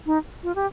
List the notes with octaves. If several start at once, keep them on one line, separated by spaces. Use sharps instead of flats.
D#4
F4
G4